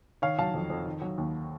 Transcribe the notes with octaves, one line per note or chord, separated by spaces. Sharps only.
D#3 C#5 F5
F#3 F5 A5
F2
F2
D#3
F#3
D#2